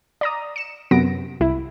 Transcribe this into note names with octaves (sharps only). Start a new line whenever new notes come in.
D5 A#5 D#6
C#7 E7
F#2 C3 B3 A#6 D7
C2 E4